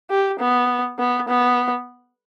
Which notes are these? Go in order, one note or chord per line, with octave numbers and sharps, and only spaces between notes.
G4
B3
B3
B3